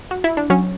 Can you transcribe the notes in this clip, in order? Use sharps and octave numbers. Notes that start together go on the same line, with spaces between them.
F#4
E4
D4
F#3 C#4